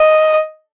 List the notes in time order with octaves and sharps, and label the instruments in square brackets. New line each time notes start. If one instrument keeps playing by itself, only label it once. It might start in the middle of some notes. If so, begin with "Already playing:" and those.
Already playing: [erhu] D#5